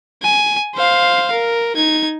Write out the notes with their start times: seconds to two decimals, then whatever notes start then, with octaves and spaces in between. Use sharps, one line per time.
0.23 G#5
0.75 C5 F5
1.32 A#4
1.76 D#4 G#6